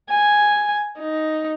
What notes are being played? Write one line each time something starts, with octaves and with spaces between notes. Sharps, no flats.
G#5
D#4